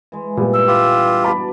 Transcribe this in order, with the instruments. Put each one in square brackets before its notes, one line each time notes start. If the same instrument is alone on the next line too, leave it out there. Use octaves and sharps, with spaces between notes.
[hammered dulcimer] E3 G#3
[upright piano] A#2 G3 [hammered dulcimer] B3
[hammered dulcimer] G2 [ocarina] E6
[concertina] F4 G4 [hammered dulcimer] B4 D6
[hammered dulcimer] B3 D#4 F#4 [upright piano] A5 B5 D6